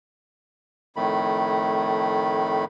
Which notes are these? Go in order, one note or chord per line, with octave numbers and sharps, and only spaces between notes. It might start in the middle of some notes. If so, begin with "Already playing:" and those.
F2 A2 D#3 A3 B5